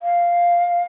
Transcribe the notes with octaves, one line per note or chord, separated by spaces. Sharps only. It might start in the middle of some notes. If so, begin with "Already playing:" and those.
F5